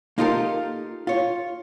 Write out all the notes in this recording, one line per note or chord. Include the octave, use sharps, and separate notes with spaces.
A#3 D#4 F4 G4 A4 A#4
F4 C#5